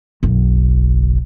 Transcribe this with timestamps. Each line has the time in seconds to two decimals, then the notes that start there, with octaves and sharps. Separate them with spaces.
0.23 F#1 B1